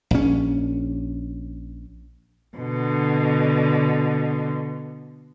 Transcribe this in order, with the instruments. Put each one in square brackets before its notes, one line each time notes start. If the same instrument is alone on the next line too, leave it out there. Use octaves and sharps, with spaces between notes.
[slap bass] A#1 C#4
[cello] B2 D3